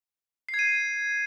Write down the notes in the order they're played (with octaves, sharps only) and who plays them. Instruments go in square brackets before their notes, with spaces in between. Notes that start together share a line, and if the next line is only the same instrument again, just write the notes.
[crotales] C7
G#6
D#7